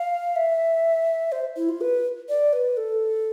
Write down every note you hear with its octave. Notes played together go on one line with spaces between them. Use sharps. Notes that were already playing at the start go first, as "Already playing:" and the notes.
Already playing: F5
E5
C5
E4
F4
B4
D5
B4
A4